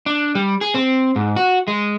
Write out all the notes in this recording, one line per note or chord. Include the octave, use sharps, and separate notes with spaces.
D4
G3
G#4
C4
G#2
F#4
G#3